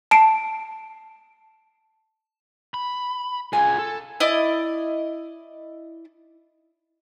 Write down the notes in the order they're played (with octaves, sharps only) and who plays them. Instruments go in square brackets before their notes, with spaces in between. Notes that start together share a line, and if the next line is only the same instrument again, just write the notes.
[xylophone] A5 C7 D7
[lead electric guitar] B5
[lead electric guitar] F4 G#4 [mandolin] G#5
[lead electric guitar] A4
[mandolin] E4 D5 D#5